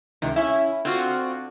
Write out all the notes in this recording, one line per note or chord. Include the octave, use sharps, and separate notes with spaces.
C#2 C3 D#3
C#4 E4 E5
D3 C4 F4 F#4